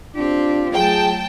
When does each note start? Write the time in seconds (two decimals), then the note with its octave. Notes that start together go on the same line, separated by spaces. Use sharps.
0.16 C4 D4 F4 G4
0.74 F#3 A3 G#4 G5 A5